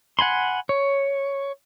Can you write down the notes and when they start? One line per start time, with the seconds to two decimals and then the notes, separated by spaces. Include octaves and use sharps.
0.19 F#5 G#5 B5 C6
0.69 C#5